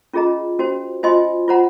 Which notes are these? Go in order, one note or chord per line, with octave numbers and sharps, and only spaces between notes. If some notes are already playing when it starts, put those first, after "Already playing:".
C#4 F4 G#4 D#5 A#5
C#4 F#4 C5
F4 C5 D#5 G#5 C6
F4 C5 F#5 A#5